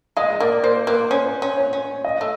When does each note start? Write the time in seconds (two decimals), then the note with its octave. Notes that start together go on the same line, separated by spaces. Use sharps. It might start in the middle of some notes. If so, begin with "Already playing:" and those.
0.17 G#3 D#5
0.40 A#3 D5
0.63 A#3 C5
0.87 A#3 B4
1.11 C#4 C5
1.42 C#4
1.57 C#5
1.73 C#4
2.05 D#5
2.21 A3